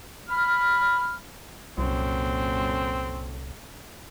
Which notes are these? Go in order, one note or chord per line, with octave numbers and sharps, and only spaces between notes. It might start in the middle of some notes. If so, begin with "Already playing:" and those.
B5 F6
C2 F#2 A#2 C4 A4